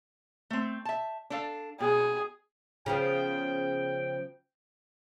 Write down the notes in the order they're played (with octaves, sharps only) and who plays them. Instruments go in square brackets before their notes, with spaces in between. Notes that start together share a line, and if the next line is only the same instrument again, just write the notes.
[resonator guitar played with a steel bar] A3 C4
E5 A5
D4 A4 F5
[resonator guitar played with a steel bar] B2 [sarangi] G#4
[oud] C#3 F3 B3 [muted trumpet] G5